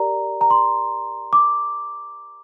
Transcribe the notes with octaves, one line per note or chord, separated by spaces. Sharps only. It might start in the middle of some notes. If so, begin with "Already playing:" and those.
Already playing: G4 A#4 D5 A#5
A#5
C6
D6